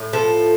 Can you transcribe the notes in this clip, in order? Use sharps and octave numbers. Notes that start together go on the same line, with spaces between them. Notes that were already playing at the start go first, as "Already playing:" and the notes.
Already playing: A2
F3 A4